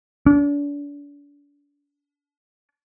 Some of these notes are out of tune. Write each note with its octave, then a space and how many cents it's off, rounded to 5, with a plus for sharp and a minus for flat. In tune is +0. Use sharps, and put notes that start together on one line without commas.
D4 -35